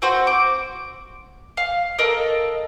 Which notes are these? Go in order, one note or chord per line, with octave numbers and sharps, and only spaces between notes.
C4 F#4 C5
D6
F5
A4 A#4 D#5